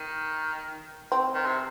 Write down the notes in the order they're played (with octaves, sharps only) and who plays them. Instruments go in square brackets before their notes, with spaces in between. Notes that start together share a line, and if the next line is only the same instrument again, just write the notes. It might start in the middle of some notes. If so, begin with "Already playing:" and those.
Already playing: [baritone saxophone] D#3
[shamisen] C4
[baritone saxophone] D#3
C3